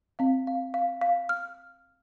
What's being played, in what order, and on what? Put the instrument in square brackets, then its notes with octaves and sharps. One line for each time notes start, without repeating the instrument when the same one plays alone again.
[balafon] C4 [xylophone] F5
[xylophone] F5
F5
F5
F6